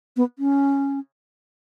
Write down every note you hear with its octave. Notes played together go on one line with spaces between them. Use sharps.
B3
C#4